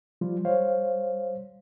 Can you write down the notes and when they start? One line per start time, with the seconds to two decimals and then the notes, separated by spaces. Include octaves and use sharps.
0.21 F3 G3 F4
0.45 G3 C5 C#5 F5